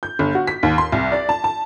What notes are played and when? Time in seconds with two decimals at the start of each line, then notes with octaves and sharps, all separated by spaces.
0.03 G6
0.19 G1
0.35 F#4
0.47 B6
0.63 D#2
0.78 C6
0.92 C2
1.12 D5
1.29 A5
1.44 A5